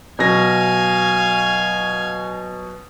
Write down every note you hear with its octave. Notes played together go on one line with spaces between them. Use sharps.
B2 F#3 F5 G#5 A#6